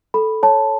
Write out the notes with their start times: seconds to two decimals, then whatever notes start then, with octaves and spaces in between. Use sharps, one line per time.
0.14 A4 B5
0.43 C#5 A5